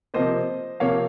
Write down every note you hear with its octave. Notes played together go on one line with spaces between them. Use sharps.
C3 F3 A#3 C5 D#5
C3 F3 A#3 C#5 F5